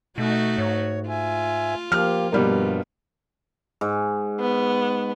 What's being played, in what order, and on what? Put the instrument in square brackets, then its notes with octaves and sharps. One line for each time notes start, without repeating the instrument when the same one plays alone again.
[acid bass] B2 [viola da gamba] A3 D#4 F#4
[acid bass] G#2 [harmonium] C#5
[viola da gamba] F4 [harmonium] E5 G#5
[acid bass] F3 [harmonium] A#3 G4 [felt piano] F6
[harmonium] G2 [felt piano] B2 G3 A#3
[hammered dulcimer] G#2
[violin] B3